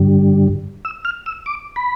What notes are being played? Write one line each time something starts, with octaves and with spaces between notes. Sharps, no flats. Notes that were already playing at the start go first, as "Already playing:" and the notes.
Already playing: G2 D3 G3
E6
F6
E6
D6
B5